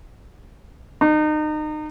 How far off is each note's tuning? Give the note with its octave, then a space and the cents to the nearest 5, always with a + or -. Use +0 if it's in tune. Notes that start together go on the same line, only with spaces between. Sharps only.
D#4 -30